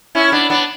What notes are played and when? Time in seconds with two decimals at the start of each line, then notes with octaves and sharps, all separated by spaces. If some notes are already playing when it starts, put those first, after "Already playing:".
0.15 C#4 E4
0.32 B3 D4
0.50 B3 D4